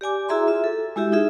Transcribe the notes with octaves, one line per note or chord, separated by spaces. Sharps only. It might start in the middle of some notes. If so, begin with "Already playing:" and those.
G4 D5 G#5 D6
E4 F#4 G#4 E5 A#5 C6
F4 E5
A4
G#3 E4 F#4 G4 E5
D#4 F4 G#4 E5